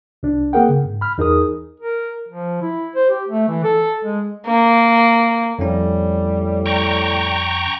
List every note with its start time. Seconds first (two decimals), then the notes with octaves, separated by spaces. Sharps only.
0.23 C2 D4
0.53 A#3 C4 G#4 A#4 F#5 G5
0.69 C#3
0.84 G#2
1.01 B5 F6
1.18 E2 D#4 G#4 A#4 D#6
1.80 A#4
2.28 F3
2.61 E4
2.95 C5
3.10 G4
3.28 A3
3.48 E3
3.64 A4
4.04 G#3
4.47 A#3
5.59 F2 A2 G3 C#4
6.66 G5 A#5 C#6